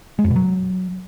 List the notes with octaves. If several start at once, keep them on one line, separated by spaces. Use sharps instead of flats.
G#3
F2
B2
F#3